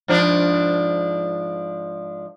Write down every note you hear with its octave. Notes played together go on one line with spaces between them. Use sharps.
G#2 F3 D4